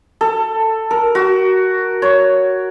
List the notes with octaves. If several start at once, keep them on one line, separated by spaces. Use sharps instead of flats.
A4
A#4
F#4
C#5